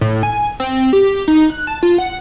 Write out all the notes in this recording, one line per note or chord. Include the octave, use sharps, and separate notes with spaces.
A2
G#5
C4
G4
D#4
F#6
A5
F4
F#5